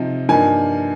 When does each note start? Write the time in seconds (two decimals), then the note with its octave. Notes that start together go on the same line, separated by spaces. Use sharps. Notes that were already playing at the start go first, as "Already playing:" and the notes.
Already playing: C3 F3 C4 D#4
0.29 G2 F3 A#3 D#4 G#5